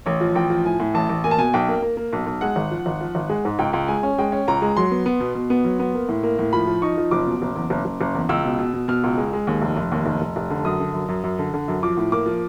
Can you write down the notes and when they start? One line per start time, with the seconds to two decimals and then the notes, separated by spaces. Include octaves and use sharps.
0.06 A1 C#5
0.21 F3
0.35 A1 G5
0.50 F3
0.65 A2 G#5
0.80 A2
0.94 A1 A5
1.09 A1
1.24 A#3 G#5
1.31 A5
1.38 B2 G#5
1.54 B1 G5
1.69 A#3
1.82 A#3
1.97 A#3
2.13 B1
2.26 B1
2.41 G#3 F#5
2.56 G#1
2.71 F3
2.86 G#1
3.01 F3
3.15 G#1
3.29 G#3
3.45 G#2
3.59 C#2 G5
3.73 C#2
3.88 G#3 G#5
4.03 C#4
4.18 G#3 G5
4.32 C#4
4.48 C#2 A#5
4.62 G#3
4.77 F#3 C6
4.91 B3
5.06 B3
5.20 B2
5.35 B2
5.50 B3
5.64 F#3
5.80 B3
5.94 A#3
6.09 A2
6.23 A#3
6.39 A2
6.53 F3 B5
6.67 F3
6.82 D#4 C#6
6.98 F3
7.11 F#1 D6
7.27 B2
7.42 F#1
7.56 E2
7.70 F#1
7.85 F#1
8.01 F#1
8.15 E2
8.29 C#2 E6
8.44 B2
8.59 B2
8.73 B2
8.88 B2 F6
9.04 C#2
9.18 G#3
9.33 G#3
9.47 D#2
9.62 F1
9.77 F1
9.92 D#2
10.06 F1
10.21 F1
10.36 F1
10.50 D3
10.65 F#2 D#6
10.80 D3
10.94 F#2
11.08 F#2
11.23 F#2
11.39 D3
11.54 D3
11.68 F#2
11.83 F3 D6
11.97 A2
12.12 A#3 D6
12.26 F3